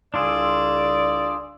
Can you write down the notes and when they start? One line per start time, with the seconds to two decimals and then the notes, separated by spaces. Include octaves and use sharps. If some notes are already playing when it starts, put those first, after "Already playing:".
0.14 C2 C#3 D4 F4 G#4 D5 E6